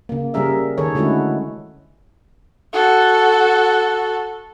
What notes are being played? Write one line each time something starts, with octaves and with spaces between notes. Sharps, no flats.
C#3 A#3
C#3 G3 C#4 G#4 A#4 E5
D#3 G#4 A4 C#5
D3 G#3 A3 C#4 E4 F#4
F#4 A4